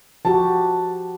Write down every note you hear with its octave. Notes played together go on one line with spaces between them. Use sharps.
F3 F#4 G4 A5